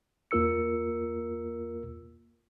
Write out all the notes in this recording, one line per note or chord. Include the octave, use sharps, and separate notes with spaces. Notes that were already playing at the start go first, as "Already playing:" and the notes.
E2 A#3 F4 A#4 E6 C#7